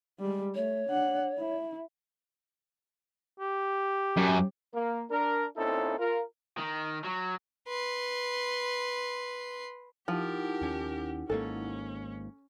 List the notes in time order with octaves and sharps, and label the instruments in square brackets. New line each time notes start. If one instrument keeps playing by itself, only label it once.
[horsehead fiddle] G3 G#3
[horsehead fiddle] A3 [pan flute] C#5
[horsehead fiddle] D4 F#5
E4
[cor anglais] G4
[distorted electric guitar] F#2
[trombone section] A#3
D4 A#4
A#2 C4 C#4 D#4 E4 A4
F4 A#4
[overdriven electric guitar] D#3
F#3
[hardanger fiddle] B4 C6
[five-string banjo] F3 [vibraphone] D#4 E4 F#5 [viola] G4 A#4
[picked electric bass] D#2 C#4
[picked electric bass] G#1 G#2 A#3 [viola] C#4 [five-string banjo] A4